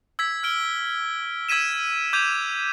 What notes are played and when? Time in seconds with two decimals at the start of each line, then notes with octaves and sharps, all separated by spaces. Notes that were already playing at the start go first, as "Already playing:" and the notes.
0.19 E6 G#6 B6
0.43 F6 D7 G7
1.49 E6 G#6 B6 D#7 E7
2.13 D6 G6 G#6 D#7 F7